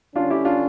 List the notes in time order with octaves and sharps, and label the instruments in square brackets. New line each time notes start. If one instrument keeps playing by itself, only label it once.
[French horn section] D3 G3 C#4 [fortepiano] D4 F4
[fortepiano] E4 G4
D4 F4